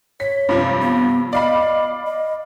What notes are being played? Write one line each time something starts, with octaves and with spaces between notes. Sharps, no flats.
C#5 B6
G2 C3 F3
B3
D5 D#5 F5 B5
D#5